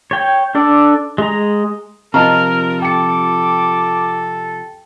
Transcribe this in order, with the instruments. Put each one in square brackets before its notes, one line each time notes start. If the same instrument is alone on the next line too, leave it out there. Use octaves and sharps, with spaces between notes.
[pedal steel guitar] C#5 G5
D4 A4 D5
G#3 A#5
[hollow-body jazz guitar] C3 F3 F4 [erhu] A#4 [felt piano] D#5 A5 A#5 [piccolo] F6
[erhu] A4 [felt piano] G5 C#7 [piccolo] D6